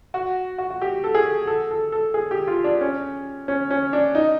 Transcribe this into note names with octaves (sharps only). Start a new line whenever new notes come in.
F#4
F#4
F#4
G4
A4
G#4
A4
A4
A4
G#4
G4
F4
D4
C#4
C#4
C#4
D4
D#4